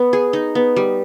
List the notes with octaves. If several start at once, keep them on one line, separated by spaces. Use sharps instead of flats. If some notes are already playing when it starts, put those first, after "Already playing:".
Already playing: B3
G#4
D#4
B3
G3